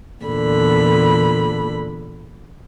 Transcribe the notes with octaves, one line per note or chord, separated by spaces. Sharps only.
E2 A#2 D3 B5